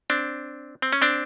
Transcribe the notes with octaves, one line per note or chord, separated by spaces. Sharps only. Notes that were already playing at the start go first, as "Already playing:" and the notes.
C4 D4
C4
C#4
C4 D4